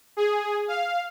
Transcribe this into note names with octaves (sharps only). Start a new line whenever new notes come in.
G#4
F5